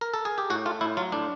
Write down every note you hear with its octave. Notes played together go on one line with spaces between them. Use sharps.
A#4
A4
G#4
G4
A2 F#4
A3 F4
A2 E4
F#3 F4
A2 D4